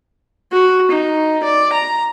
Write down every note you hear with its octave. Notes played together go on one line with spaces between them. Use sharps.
F#4
D#4
D5
A#5